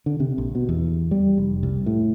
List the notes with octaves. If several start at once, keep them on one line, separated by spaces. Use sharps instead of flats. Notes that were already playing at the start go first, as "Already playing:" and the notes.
D3
C3
A#1
B2
E2
G3
F1
C2
A2